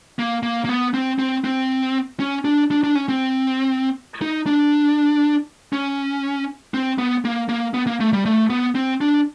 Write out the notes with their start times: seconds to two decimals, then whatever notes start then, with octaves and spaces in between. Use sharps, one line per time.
0.19 A#3
0.43 A#3
0.65 A#3
0.69 B3
0.94 C4
1.19 C4
1.44 C4
2.20 C#4
2.45 D4
2.71 D4
2.84 D4
2.95 C#4
3.09 C4
4.22 D#4
4.46 D4
5.73 C#4
6.74 C4
6.98 B3
7.25 A#3
7.49 A#3
7.74 B3
7.87 A#3
8.00 A3
8.13 G3
8.25 A3
8.50 B3
8.75 C4
9.01 D4